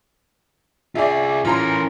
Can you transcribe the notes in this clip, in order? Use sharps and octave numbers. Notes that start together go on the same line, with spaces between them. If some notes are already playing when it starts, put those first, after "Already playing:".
F4 G#4 D5 E5
E3 C#4 F4 A#4 A#5 C6